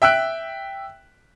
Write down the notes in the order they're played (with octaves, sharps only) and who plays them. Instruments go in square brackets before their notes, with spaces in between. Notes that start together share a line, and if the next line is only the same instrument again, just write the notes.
[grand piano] E5 G5 E6 F#6 D7